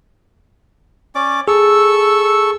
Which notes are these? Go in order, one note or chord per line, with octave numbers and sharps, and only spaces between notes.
C#4 D5 D6
G#4 A4 C#6 E6